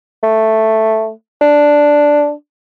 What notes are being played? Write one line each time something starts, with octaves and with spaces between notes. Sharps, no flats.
A3
D4